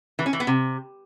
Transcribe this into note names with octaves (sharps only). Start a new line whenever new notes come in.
E3
C#4
E3
B3
C3